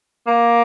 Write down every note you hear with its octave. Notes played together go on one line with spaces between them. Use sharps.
A#3